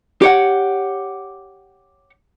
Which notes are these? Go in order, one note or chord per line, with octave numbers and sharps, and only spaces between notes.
G4 C#5 F#5